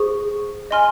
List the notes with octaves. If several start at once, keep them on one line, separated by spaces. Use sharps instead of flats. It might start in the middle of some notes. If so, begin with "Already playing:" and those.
Already playing: G#4 C5 C#6
D#5 G#5 C6 F6